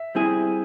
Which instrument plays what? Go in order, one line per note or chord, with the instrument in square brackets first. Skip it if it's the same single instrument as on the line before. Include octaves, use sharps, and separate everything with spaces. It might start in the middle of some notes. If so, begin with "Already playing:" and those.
Already playing: [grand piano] E5
[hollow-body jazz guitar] G3 C4 E4 G#4